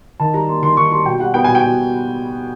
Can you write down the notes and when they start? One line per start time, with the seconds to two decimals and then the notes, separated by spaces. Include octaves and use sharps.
0.20 D#3 A5
0.34 G3 A#5
0.49 A#3 C6
0.63 D#3 C6
0.77 D#3 C#6
0.91 G3 C6
1.06 B2 G5
1.20 G3 F#5
1.34 B3 G5
1.44 B2 G#5
1.55 G5
1.63 B2